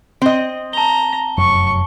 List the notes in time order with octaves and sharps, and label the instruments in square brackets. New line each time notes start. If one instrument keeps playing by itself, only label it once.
[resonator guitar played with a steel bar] C4 D#5
[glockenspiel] A5 G7 [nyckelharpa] A#5
[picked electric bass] F1 F#2 F#3 [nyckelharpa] C#6